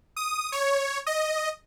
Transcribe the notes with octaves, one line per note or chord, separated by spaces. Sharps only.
D#6
C#5
D#5